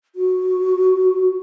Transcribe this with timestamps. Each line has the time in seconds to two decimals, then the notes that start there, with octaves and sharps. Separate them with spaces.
0.16 F#4